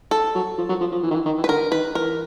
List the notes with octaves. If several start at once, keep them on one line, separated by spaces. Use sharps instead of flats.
A4
F#3
F3
F#3
F3
F3
E3
D#3
E3
D#3
E3
B4
D3 A#4
D#3 B4
E3 A#4